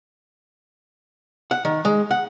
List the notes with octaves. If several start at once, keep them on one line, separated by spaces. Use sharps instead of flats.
F#5
D#3
G#3
F#5